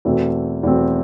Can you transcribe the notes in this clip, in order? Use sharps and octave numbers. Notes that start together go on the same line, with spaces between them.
E2 B2 A3 C4
E2 B2 A3 C4